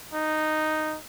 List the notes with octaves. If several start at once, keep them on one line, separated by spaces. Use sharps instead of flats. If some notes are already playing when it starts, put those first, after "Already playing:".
D#4